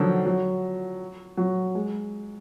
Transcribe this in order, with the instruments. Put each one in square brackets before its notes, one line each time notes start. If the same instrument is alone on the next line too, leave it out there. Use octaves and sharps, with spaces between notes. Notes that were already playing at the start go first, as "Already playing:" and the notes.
Already playing: [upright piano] D3 D#3 F3 F#3
F#3
F#3
G#3